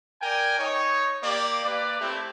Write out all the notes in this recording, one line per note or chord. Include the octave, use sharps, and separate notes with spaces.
A#4 D5 G5 G#5
D#4 C#5
A#3 G4 D5
A#3 B4 D5
A3 C4 E4 G4